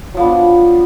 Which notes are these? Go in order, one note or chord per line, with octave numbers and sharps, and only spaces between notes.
F3 F#3 B3 D4